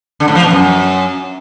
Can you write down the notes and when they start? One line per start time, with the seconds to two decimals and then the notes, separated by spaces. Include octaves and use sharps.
0.20 D3
0.28 A2
0.35 F3
0.43 B2
0.51 F#2